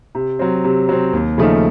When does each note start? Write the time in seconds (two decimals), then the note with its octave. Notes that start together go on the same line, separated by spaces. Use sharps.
0.15 C3
0.39 F#3 C4
0.64 C3
0.89 F#3 C4
1.13 D#2
1.38 C#3 F3 A3 D#4